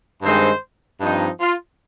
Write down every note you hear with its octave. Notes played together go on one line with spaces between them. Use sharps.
G2 D#3 G#3 C4 D#4 C5
G2 F3 C4 D#4
F4